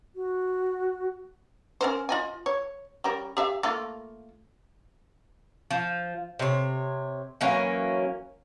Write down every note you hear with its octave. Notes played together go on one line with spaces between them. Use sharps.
F#4
C#4 A#4 C5
F4 D#5 G#5
C#5
G3 C#4 A#4
G4 E5 F5
A3 A#3 F4
F3
C3 C#5
E3 F#3 A#3 C#4